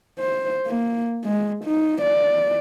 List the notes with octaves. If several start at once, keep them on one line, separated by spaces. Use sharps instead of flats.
C5
A#3
G#3
D#4
D5